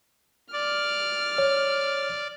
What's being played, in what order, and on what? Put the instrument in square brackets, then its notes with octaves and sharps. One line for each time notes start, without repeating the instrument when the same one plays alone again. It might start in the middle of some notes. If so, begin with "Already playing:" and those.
[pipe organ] D5 [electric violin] F6
[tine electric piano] C#5